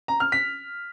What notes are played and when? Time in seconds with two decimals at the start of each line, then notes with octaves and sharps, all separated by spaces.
0.08 A#5
0.20 F6
0.32 B6